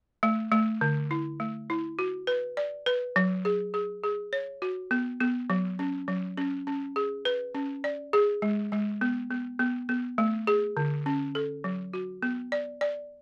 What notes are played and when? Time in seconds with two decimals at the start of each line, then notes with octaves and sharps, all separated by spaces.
0.23 A3
0.52 A3
0.81 D3
1.11 E4
1.40 A3
1.70 E4
1.99 F#4
2.27 B4
2.57 D5
2.86 B4
3.16 F#3
3.45 G#4
3.74 G#4
4.04 G#4
4.33 C#5
4.62 F#4
4.91 B3
5.21 B3
5.50 F#3
5.79 C#4
6.08 F#3
6.38 C#4
6.67 C#4
6.96 G#4
7.25 B4
7.55 C#4
7.84 D5
8.13 G#4
8.42 G#3
8.72 G#3
9.01 B3
9.31 B3
9.59 B3
9.89 B3
10.18 A3
10.47 G#4
10.77 D3
11.06 C#4
11.35 A4
11.64 F#3
11.94 F#4
12.23 B3
12.52 D5
12.81 D5